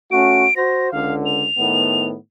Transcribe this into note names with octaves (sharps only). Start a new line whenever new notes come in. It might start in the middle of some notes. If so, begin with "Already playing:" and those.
A3 C#4 F#4 D7
F#4 C5 A#6
C#2 D3 F5
F7
A2 D#3 B3